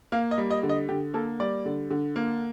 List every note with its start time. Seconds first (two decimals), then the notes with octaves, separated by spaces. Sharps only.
0.12 A#3 F5
0.31 D#5
0.38 G3
0.51 D#5
0.63 D3
0.69 D#5
0.89 D3 G4
1.14 A#3 A4
1.40 G3 D5
1.66 D3
1.91 D3
2.16 A#3